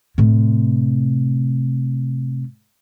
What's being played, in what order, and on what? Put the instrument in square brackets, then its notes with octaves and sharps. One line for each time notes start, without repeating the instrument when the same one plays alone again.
[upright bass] A2 C3